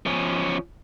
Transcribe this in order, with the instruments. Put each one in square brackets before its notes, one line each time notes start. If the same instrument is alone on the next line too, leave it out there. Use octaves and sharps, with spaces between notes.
[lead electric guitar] F3 C#4